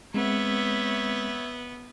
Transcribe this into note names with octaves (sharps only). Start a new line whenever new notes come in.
G#3 B3 C4 C#5 E5